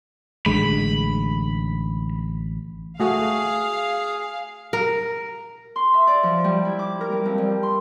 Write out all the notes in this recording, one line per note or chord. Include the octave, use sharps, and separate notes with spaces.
A1 D3 G#3 B5
A3 F#4 G#4 F5
A#4
C6
E5
D5
F3
G3
E4
D6
A#4
G3
F2
G3
C6